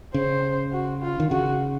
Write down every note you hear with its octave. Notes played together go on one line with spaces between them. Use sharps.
C#3 C5
F#4
F4
D#3
C#3 F#4